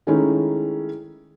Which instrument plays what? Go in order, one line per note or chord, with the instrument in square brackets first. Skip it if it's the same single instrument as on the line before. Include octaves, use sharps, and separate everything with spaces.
[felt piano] D#3 G#3 A3 C#4 D#4 E4